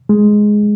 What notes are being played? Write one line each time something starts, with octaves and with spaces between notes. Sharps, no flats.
G#3